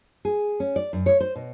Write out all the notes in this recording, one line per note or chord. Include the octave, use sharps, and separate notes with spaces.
G#4
C#4
D5
F#2
C#5
C5
B2